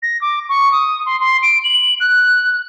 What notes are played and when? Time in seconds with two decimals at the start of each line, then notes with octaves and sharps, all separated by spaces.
0.02 A#6
0.21 D6
0.49 C#6
0.72 D#6
1.06 C6
1.20 C6
1.42 D7
1.64 F#7
2.00 F#6